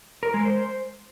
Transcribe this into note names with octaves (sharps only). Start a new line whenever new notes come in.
A#4
G#3
C5